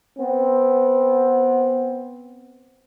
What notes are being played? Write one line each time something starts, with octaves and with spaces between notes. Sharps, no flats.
B3 C4